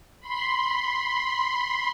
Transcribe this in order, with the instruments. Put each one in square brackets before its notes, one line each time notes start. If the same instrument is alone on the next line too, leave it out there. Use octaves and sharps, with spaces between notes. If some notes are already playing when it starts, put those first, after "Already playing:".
[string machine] B5 C6